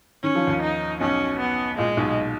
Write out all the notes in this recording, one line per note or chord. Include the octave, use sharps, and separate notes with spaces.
D#3 C#4
F3
D#2 D#3
D#4
B1 B2 C#4
B3
A#2 G#3
B1 B2